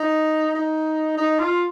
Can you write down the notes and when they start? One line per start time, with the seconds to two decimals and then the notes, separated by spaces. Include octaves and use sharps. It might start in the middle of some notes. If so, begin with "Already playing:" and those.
Already playing: D#4
0.55 D#4
1.18 D#4
1.39 F4